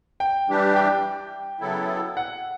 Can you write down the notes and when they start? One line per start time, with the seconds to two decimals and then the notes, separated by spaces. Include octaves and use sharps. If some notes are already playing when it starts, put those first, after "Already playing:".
0.20 G5
0.48 E3 G3 D4 G4
0.76 G5
1.60 C#3 F#3 B3 E4 A4
2.17 F#5